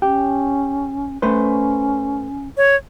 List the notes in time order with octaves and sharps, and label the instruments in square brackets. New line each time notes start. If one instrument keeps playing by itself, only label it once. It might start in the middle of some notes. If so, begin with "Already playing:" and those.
[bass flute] C#4 [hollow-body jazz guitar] G4
[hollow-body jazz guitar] A3 B4 C5 [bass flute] C#4
[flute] C#5